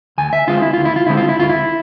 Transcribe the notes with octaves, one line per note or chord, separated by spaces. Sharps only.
D2 G#5
E5
D3 G#3 C4 F4
E4
D2 F4
E4
F4
D3 G#3 C4 E4
F4
E4
D2 F4
E4